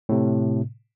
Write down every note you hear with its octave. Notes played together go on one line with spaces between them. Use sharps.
A2 C3